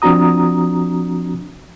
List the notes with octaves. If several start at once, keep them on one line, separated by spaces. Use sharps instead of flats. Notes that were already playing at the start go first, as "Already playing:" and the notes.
F3 C4 D4 F#4 A#5 D#6